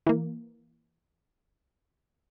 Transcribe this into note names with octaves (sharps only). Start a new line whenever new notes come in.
E3 A#3